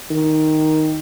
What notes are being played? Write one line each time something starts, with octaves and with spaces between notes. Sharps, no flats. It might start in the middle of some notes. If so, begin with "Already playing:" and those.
D#3